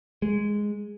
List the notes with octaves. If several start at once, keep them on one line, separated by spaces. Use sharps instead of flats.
G#3